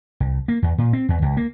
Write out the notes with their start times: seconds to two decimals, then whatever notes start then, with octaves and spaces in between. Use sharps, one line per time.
0.20 C2
0.48 A#3
0.62 E2
0.78 A#2
0.93 C4
1.09 E2
1.22 C#2
1.37 A#3